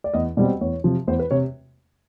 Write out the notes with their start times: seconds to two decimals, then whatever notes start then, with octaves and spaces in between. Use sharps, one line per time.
0.04 D5
0.14 E2 D#5
0.37 B2 G3 C4 D5
0.61 E2 C#5
0.84 C3 F3
1.07 E2 C5
1.19 B4
1.31 C3 C#5